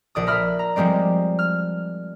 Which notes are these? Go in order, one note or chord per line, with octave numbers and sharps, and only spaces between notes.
A#1 D5 D#6
A#4 E5 B5 F6
A#5
F3 G3 G#3 C4 D5
F6